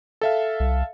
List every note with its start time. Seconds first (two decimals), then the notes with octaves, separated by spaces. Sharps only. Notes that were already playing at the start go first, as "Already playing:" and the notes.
0.21 A4 E5 F5
0.60 C2